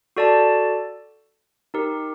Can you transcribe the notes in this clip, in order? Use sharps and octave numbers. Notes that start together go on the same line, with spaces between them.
F#4 A4 D5 A5
D#4 G4 A#4